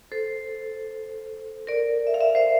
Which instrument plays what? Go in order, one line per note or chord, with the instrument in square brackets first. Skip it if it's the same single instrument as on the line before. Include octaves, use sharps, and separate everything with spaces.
[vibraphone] A4 C5
A#4 D5
E5
F5
E5
F5
C5 E5